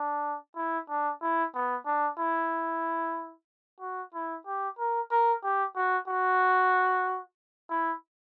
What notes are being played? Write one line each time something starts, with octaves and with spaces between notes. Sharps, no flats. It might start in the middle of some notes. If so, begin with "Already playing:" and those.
Already playing: D4
E4
D4
E4
B3
D4
E4
F#4
E4
G4
A#4
A#4
G4
F#4
F#4
E4